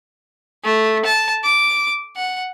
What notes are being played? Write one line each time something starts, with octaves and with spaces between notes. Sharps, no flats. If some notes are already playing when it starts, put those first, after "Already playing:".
A3
A5
D6
F#5